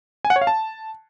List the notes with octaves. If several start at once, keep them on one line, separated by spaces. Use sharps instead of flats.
G#5
F#5
C#5
F5
A5